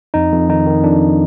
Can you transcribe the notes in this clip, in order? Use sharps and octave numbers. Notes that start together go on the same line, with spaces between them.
F2 D#4
F2
D#3 D#4
D#3
F2 D4